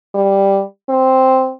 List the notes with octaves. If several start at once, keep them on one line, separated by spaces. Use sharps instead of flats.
G3
C4